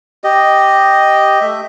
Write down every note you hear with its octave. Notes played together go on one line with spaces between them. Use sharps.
G4 D#5
A3 E5